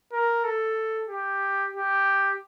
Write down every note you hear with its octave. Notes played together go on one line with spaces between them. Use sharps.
A#4
A4
G4
G4